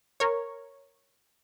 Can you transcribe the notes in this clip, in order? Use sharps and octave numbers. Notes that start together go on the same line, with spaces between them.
A#4 C#5